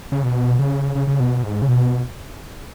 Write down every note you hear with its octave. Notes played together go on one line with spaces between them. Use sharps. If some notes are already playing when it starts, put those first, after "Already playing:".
C#3
B2
C#3
C#3
C#3
B2
G#2
C#3
B2